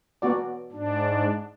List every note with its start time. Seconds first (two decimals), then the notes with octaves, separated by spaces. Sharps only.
0.22 B3 F#4 D5
0.72 G#2 D4